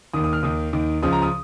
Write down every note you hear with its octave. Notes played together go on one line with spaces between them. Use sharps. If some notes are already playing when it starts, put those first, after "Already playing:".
D#2 D#3 D#6
D#6
F6
D#2 D#3 D#6
D#2 D#3
C#2 C#3 F3 D#6
A#5
D#6